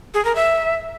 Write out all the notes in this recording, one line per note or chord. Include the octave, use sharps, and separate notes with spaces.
G#4
A#4
E5